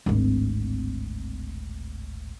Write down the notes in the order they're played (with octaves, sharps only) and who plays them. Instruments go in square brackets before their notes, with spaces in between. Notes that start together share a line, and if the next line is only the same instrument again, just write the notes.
[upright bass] D1 G#1